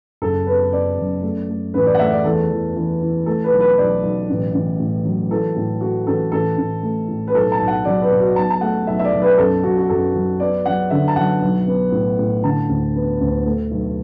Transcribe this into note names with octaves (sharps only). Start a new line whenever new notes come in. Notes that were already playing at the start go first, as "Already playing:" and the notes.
F#1 A4
B3 B4
B3 D5
F#2
A3
A3
A1 B4
D5
F#5
A3 E5
D5
E2 A4
E2
E3
E3
A3 A4
B4
B1
B4
B1 D5
B1
A1
A1
A2
F#3
E3 A4
A2
A3 F#4
A1 A4
A1 A4
A1
A3
A2
B4
B1 A4
A5
B1
F#5
F#3 D5
B4
B2
F#4
B1 A5
A5
A3 F#5
B1 E5
E5
D5
B1
B4
F#2 A4
F#2 F#4
F#4
F#2 A4
F#3
B3 D5
F#3 F#5
D3 E5
A5
F#3 F#5
B1
B3
A2
A2
D3 A5
D2
B3
D2
A3
B1